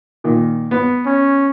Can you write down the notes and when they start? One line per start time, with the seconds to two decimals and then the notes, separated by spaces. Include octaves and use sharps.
0.24 A#2 D#3
0.71 B3
1.06 C#4